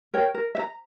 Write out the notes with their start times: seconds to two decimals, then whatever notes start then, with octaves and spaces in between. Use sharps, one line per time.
0.14 A#4 C#5 G5
0.34 A#4
0.55 E5
0.59 A#5